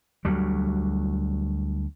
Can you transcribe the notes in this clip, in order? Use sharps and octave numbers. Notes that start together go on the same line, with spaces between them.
D2 F#3 G3